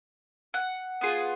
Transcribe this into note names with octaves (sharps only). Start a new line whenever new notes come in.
F#5
B3 F4 G#4